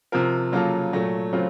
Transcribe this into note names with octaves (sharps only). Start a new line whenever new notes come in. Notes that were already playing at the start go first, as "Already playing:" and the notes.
C3 F3 C4 F4 A#4
C#3 F#3 A#3 F4 A4
A#2 F#3 A3
C#3 F#3 A3 C4 F4